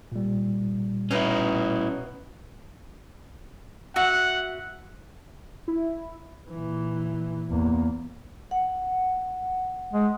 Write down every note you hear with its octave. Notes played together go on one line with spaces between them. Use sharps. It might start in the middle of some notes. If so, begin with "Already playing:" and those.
A#2 G3
B2 C#4 D#4 E4 D#5
F#4 E5 F#5
E4
A#2 E3
E2 A#3
F#5
G#3